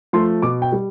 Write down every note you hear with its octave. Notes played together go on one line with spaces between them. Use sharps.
F3 A3 C6
B2 D6
G5
G3